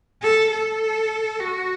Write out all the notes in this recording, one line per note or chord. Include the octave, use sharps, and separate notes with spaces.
A4
A4
F#4